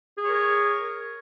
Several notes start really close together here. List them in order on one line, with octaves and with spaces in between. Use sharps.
G#4 C#5 A#4